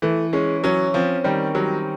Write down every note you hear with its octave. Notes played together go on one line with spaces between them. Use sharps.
E3 A3
G#3 C#4
F#3 C#4
F3 C4
D#3 G3
F#3 G3